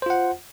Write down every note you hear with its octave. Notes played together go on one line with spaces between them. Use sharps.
F4 C5 F#5